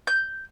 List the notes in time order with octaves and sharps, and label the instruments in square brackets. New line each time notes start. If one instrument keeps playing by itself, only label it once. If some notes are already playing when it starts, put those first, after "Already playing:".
[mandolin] G6